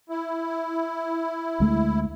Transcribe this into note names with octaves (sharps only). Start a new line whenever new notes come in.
E4
D2 G#3 A3